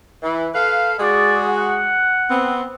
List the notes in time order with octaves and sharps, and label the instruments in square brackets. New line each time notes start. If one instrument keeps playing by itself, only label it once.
[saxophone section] E3
A4 B4 F5
[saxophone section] G#3 F#4 G#4 [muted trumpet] D5
[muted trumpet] F#5
[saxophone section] B3 C4